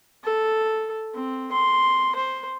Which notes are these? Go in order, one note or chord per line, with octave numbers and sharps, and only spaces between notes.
A4
C4
C6
C5